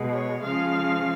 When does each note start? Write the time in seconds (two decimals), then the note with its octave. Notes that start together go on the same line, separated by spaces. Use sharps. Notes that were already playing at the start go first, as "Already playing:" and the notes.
Already playing: B2 G#3
0.12 C#5
0.41 C#3 F3 G#3 F5